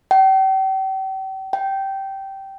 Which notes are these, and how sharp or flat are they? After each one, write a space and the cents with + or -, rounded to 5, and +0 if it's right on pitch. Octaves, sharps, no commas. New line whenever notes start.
G5 -40
G5 -15